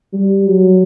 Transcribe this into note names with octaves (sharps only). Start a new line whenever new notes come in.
G3
F#3